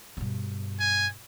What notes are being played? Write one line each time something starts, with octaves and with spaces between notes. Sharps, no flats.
G2 B2
G#5